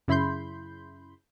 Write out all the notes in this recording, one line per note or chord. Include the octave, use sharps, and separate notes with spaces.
F#2 C#3 E4 B5 C6 G6